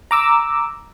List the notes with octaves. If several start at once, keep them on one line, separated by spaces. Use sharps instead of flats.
A#5 D6 E6